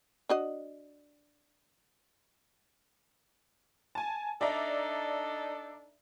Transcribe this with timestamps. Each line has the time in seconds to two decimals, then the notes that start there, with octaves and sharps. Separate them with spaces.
0.29 D4 F#4 D#5
3.95 G#5 A5
4.41 D4 D#4 A4 D5 E5 A#5